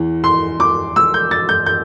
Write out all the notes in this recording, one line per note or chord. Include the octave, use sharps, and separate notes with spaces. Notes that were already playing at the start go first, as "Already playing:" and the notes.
Already playing: E2 E3
C6
D6
E6
G6
A6
G6
G6